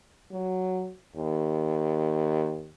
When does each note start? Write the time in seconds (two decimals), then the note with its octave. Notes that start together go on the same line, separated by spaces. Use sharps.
0.31 F#3
1.16 D#2